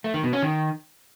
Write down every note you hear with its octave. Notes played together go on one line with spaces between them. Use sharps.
A3
D#3
B2
C#4
D#3